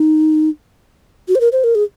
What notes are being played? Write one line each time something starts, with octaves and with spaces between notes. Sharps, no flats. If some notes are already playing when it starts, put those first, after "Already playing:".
Already playing: D#4
F#4
C5
A#4
C5
A#4
G#4